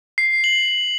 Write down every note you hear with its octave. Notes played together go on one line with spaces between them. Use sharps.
C7
F#7